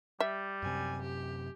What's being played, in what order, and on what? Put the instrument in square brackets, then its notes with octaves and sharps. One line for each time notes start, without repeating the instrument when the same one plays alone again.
[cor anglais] G3 [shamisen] E5
[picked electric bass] F#2 C3 [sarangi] G#5
[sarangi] G4